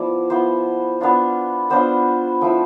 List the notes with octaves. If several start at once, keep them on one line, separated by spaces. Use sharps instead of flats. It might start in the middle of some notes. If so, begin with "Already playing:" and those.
Already playing: F3 B3 E4 D5
F3 B3 E4 C5
B3 D4 F4
B3 D4 F4 C5
F3 A3 E4